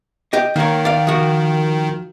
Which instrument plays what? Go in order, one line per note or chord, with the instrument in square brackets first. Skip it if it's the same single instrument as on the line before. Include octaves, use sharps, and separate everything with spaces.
[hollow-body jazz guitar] G4 D#5
[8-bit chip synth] D#3 [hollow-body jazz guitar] A#3 C#5
[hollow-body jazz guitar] D5 F5
F3 F#4